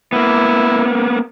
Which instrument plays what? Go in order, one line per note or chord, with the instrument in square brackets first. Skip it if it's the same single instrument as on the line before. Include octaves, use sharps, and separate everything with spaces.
[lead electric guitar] A#3 B3 [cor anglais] E4